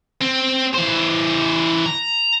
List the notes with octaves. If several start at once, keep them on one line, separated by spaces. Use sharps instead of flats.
C4
E3 C5
A#5